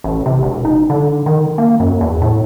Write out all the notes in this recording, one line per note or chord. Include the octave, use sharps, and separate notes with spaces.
A1
C3
E1
D#4
D3
D#3
A#3
F#2
E2
A2